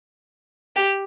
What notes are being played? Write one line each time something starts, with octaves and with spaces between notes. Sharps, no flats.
G4